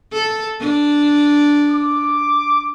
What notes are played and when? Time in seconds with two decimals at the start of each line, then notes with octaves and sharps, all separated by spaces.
0.13 A4
0.60 D4
1.71 D6